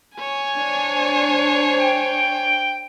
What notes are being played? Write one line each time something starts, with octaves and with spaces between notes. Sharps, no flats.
C#5 G#5
D4 C5
G5